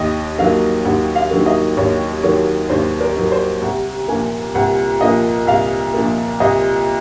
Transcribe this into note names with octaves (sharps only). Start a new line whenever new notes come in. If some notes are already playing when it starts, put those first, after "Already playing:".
Already playing: D#2 D#5
D#3 F#3 A#3 F5
D#2 F#5
F5
D#3 F#3 A#3
D#5
D#2 C#5
D#3 F#3 A#3 C#5
D#2 C5
A#4
D#3 F#3 A#3
C5
C2 F#5
A#2 F3 A#3 G#5
C2 F#5
A#2 F3 A#3 D#5
C2 F5
A#2 F3 A#3
C2 D#5